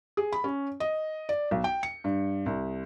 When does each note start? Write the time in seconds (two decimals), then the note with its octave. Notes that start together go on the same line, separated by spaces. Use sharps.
0.17 G#4
0.33 B5
0.44 C#4
0.80 D#5
1.29 D5
1.51 B1
1.64 G5
1.83 C#7
2.04 G2
2.46 C2